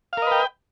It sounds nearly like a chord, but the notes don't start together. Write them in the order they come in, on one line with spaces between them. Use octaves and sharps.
F5 A#4 D#5 B4 G5